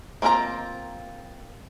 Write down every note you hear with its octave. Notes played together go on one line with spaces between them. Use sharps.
A#3 C4 F4 A#4 A#5